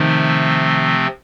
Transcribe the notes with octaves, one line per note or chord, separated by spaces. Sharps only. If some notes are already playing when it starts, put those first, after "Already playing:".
Already playing: C3 D#3 F3 A3 C4